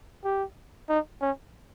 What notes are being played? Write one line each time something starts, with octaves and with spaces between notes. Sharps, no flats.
G4
D#4
C#4